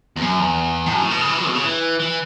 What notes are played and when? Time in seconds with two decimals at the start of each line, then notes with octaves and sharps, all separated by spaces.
0.16 E2
0.22 F#2
0.40 E2
0.86 A2
0.93 F#2
1.01 A2
1.11 B2
1.20 C#3
1.29 E3
1.38 F#3
1.47 B2
1.55 C#3
1.64 E3
1.99 E3